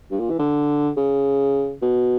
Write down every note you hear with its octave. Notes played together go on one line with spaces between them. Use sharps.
G2
A#2
E3
D3
C#3
B2